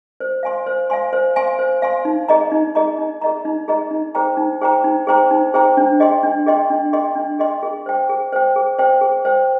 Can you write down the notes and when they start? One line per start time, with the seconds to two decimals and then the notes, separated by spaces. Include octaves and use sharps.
0.20 C5
0.43 F5 G#5 C6
0.66 C5
0.90 F5 G#5 C6
1.13 C5
1.36 F5 G#5 C6
1.59 C5
1.82 F5 G#5 C6
2.05 D#4
2.29 G#4 D#5 A#5
2.52 D#4
2.75 G#4 D#5 A#5
2.98 D#4
3.22 G#4 D#5 A#5
3.45 D#4
3.68 G#4 D#5 A#5
3.91 D#4
4.15 G#4 C5 G5 A#5
4.37 D#4
4.61 G#4 C5 G5 A#5
4.84 D#4
5.07 G#4 C5 G5 A#5
5.31 D#4
5.54 G#4 C5 G5 A#5
5.77 D4
6.00 G#4 D#5 G5 C6
6.23 D4
6.46 G#4 D#5 G5 C6
6.70 D4
6.93 G#4 D#5 G5 C6
7.16 D4
7.39 G#4 D#5 G5 C6
7.63 G#4
7.86 C5 G5
8.09 G#4
8.33 C5 G5
8.56 G#4
8.79 C5 G5
9.01 G#4
9.25 C5 G5